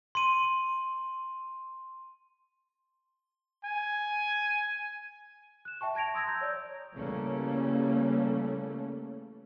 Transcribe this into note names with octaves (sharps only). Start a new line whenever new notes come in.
C6 D#7
G#5
F#6 E7
E5 G5 A5 C#6
A5 G#6 A#6 D7 F7
C6 D#6 E6 G#6 A#6
A#5 E6 G6 G#6
C#5 D5 G6
C#3 E3 G3 A3 A#3 C#4